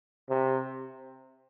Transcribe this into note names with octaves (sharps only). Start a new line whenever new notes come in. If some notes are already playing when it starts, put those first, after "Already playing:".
C3